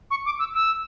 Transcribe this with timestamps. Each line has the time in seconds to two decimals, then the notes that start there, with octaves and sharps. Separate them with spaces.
0.11 C#6
0.25 D6
0.39 E6
0.54 E6